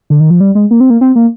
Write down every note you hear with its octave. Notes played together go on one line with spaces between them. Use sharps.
D3
D#3
F3
G3
G#3
A#3
C4
A#3
C4
A#3